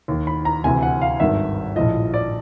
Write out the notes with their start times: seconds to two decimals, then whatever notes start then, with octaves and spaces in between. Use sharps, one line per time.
0.08 D#2 D#3
0.27 B5
0.45 A#5
0.64 D2 C3 E3 G#5
0.82 F#5
1.02 F5
1.20 G#1 G2 D#3 E5
1.76 A#1 A2 F3 D#5
2.14 D5